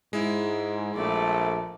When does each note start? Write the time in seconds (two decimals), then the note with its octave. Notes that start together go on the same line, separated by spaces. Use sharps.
0.13 G#2 G#3 E4
0.95 A#1 A3 D5